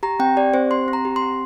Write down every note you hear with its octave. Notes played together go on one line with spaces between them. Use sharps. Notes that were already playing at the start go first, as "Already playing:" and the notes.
G4 A#5
C4 G5
G4 D5
C4 C5
G4 C6
C4
A#5
G4
C6
C4